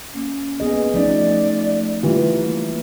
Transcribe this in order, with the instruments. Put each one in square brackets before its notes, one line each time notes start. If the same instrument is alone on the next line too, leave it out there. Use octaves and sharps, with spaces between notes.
[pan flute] A#3 [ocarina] C#4
[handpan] B3 G#4 D#5
[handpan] F3 C#4 D#4 [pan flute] A3 [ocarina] D5
[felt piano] E3 G3 F4 [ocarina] A#3